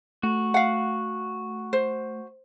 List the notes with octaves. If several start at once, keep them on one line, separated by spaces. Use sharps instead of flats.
A3 F#4
F5 F#5
C5